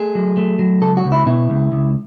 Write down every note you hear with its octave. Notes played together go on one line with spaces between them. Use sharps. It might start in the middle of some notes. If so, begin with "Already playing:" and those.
Already playing: A3 G#4
F#3
A3
F#3
C#2 A4
F#4
C#2
E4
B2 E4
C#2
C#2